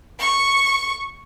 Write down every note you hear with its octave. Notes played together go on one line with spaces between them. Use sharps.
C#6